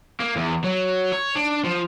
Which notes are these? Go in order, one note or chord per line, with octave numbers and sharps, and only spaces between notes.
A#3
E2
F#3
C#5
D4
F3